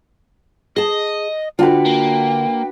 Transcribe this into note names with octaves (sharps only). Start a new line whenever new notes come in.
G#4 D#5 A5
D3 D4 F4 F#4 B4 G5
A#3